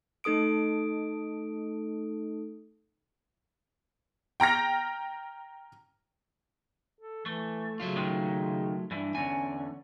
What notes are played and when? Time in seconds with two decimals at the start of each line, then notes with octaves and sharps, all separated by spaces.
0.24 A3 D#4 A4 D#6 D7
4.40 G5 A#5 F6 A#6
6.99 A4
7.26 E3 A3
7.80 C#3 F#3 A3 F4
7.97 D#3 G#3
8.91 G2 E3 D4
9.15 E2 D3 C#4 G#5